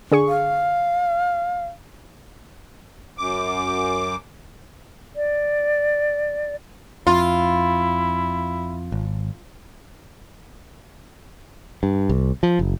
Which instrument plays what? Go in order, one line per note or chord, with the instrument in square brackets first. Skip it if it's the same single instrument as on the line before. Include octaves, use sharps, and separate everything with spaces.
[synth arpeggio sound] D3 G#4 C#6
[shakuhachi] F5
[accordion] F#2 D6
[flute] D5
[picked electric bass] F2 [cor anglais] E4 [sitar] F4
[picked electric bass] G#1
[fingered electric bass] G2
C2
F3
F#1